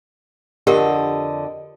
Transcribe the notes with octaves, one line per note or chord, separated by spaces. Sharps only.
F2 D3 G4 A#4 D#5